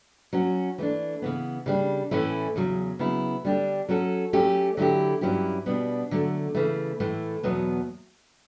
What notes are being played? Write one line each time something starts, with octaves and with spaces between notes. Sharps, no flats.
F#3 C#4 F#4
E3 A3 D4
C#3 E3 B3
C#3 G3 D4
A2 E3 A3 C#4 E4
E2 C#3 F#3
C#3 F#3 B3 E4
D3 G3 D4 G4
F#3 C#4 F#4 A4
F#3 A3 C#4 G4
D3 F#3 A3 E4 G4
G2 F#3 C#4 E4 G4
B2 G3 B3 D4
D3 F#3 A3
C#3 E3 A3
A2 E3 A3
E2 B2 F#3 B3